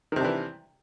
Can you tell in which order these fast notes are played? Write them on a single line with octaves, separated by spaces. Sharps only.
D#3 C3 D4 E3